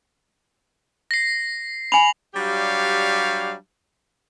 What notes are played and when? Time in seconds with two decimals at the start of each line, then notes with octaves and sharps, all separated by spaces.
1.11 A#6 C7
1.92 G#5 B5 F7 F#7
2.34 F#3 G3 D4 G4 C#5 F5